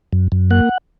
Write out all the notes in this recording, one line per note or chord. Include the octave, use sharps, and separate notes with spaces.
F#2
F#2
A#3 F#5